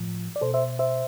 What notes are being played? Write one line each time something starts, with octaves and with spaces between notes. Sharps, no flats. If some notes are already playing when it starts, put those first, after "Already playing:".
Already playing: A2 F3
D5
B2 A4 C5
C5 E5
C5 E5